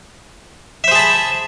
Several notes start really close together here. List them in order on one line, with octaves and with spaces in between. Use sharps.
E5 C5 G#4 A5 B5